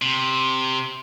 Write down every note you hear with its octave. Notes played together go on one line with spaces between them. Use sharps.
C3